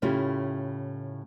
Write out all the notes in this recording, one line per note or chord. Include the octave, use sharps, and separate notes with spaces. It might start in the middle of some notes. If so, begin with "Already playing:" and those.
A2 C#3 A3 E4 F4 G4